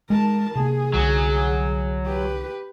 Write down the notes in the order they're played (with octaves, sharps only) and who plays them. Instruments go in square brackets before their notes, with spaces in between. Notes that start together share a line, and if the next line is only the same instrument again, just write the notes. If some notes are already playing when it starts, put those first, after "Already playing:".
[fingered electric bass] G#3 [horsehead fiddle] A#4 A5
[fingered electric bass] C3 A#3 [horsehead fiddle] G#4
[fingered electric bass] C2 D3 [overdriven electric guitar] F#3
[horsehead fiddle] G4 B4